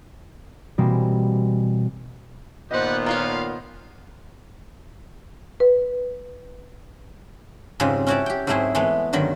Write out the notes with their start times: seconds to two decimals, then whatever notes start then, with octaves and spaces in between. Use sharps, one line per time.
0.78 B2 E3 G3 A#3 C4
2.71 A#2 D#3 B3 G4 B4 C5 D#5 F#5
3.06 A#3 F4 C#5 F5
5.60 B4
7.80 F2 G#2 C#3 G3 G#3 C4
8.07 C#4 E4 F#4 G4 D5 A5
8.26 G4 G5
8.47 G#2 F#3 A3 C4 E4 G#4
8.75 E3 G#3 A3 B3
9.13 G2 D3 D#3 F#3 B5